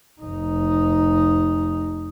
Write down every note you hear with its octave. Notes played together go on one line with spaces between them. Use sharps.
F1 D#4